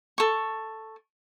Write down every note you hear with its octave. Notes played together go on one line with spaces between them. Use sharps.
A4 C#6